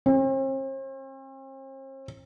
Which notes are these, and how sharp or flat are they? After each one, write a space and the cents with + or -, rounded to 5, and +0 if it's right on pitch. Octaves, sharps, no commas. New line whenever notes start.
C4 +45